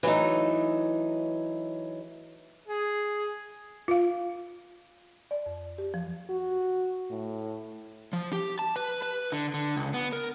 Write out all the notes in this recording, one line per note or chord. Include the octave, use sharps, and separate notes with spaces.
E3 F#3 A3 D#4
G#4
F4 F5
D5
F2
G4
F3
F#4
A2
F3
G4
A5
B4
B4
D3
D3
C#2
B3
A#4